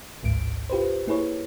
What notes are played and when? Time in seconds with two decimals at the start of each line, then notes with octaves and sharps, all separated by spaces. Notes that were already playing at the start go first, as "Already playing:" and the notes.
0.23 A1 D2 G#2 D7
0.70 F4 G4 B4 C5
1.07 A#3 E4 G#4 B4 C#5